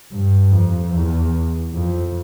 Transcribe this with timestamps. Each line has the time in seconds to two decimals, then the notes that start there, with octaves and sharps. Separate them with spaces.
0.12 G2
0.52 F2
0.93 E2
1.73 F2